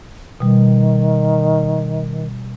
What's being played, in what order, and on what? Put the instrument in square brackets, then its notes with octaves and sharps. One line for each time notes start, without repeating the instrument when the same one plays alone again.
[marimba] B2 G3 [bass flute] D#3